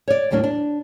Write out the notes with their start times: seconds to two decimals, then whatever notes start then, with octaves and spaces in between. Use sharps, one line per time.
0.08 C#5 D5
0.31 D#2 A2 F#3 A#3 D4
0.44 D4